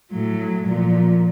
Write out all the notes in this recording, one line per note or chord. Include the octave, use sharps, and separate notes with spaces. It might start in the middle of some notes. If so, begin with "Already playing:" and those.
A2 F#3
A#2 F3